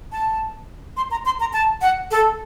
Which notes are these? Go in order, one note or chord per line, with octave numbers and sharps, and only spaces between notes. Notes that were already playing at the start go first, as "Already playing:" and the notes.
A5
C6
A#5
C6
A#5
A5
F#5
A4